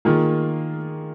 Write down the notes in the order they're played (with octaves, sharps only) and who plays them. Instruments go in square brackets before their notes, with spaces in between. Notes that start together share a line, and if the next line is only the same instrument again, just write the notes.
[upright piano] D#3 A#3 F4 G#4